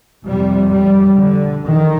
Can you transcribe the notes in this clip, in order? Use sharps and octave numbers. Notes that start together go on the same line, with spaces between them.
F2 C3 G3
G3
D3
D#3